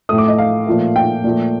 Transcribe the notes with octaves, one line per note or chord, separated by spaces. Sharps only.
A2 A3 D#6
D6
D#5
F5
A#2 F3 A3
G5
A#2 F3 A3